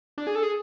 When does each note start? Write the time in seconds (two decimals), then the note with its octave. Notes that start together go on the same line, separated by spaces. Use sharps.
0.18 D4
0.27 G#4
0.35 A4
0.43 G#4